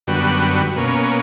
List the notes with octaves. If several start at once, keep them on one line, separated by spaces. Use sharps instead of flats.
F#2 D3 G3 B3 F#4
B2 A#3 C#4